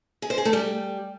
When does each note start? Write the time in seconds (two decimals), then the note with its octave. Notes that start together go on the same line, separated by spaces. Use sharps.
0.22 G#4
0.30 C5
0.38 G#4
0.45 A3
0.53 G3